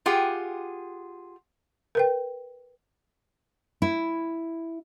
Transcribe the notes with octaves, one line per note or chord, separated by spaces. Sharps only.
F4 G4 G#4 F#5 G5
A#4 B4 G5
E4